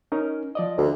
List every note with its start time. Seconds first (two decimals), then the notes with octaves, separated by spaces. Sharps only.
0.12 C#4 D#4 A#4
0.55 F3 D5 D#5
0.78 D2